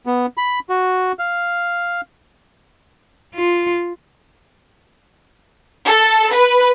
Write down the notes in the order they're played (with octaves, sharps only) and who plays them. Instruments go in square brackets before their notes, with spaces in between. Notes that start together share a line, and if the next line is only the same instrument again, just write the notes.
[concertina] B3
B5
F#4
F5
[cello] F4
[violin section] A4
B4